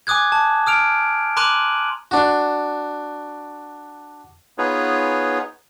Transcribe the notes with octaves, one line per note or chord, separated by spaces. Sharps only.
G#5 D6 D#6 F#6 G#6
A5
D#6 F6 D7 F7
A#5 C6 D6 F#6 D#7 F#7
D4 F#4
B3 D#4 F4 G#4 B4 C#5